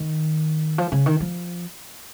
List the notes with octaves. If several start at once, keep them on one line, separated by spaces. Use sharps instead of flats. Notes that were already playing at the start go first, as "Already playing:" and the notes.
Already playing: D#3
F3
C#3
D#3
F3